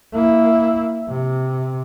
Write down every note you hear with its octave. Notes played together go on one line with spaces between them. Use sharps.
A#3 E4
C3